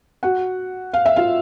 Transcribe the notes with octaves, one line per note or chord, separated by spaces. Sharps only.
F#4 F#5
F5
E5
F4 F5